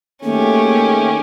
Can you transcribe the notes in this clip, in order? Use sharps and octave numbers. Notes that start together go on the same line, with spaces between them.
D#3 A3 A#3 C#4 G4 G#4